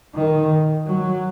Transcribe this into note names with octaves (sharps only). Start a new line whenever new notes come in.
D#3
F#3